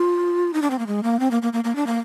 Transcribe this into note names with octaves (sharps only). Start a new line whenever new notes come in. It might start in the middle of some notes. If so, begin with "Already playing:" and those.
Already playing: F4
D#4
D4
C4
A#3
G#3
A#3
C4
A#3
A#3
A#3
A#3
D4
A#3